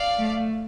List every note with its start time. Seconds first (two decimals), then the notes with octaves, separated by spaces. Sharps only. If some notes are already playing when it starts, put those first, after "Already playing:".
Already playing: D5 F5
0.17 A3